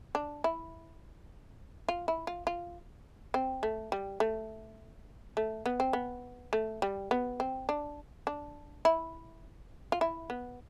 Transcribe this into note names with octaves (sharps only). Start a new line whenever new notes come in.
D4
E4
F4
E4
F4
F4
C4
A3
G3
A3
A3
B3
C4
B3
A3
G3
B3
C4
D4
D4
E4
F4
E4
B3